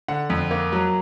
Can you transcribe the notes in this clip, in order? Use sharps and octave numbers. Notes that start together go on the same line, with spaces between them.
D3 F#5
F2
A#3
F#3